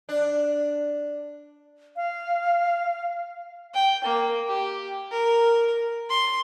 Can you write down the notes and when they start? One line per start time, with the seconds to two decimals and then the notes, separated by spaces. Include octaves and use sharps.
0.09 D4
1.96 F5
3.74 G5
4.04 A#3
4.48 G4
5.12 A#4
6.09 C6